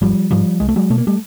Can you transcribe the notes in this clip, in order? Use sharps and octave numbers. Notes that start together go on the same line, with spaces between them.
G#1 F3 G3
G#2 F3 G3
C2 G#3
A3
F#3 G#3
B2 A3
A#3
G3 A3